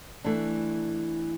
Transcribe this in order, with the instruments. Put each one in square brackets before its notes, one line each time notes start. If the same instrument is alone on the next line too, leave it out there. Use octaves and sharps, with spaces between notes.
[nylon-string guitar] E3 A3 D4